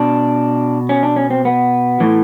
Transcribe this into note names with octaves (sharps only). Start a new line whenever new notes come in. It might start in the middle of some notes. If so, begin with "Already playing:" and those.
Already playing: B2 D4
C#4
D4
C#4
C4
B3
A2 E3